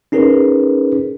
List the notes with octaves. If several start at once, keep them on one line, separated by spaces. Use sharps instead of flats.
C#4 D#4 G#4 A#4 B4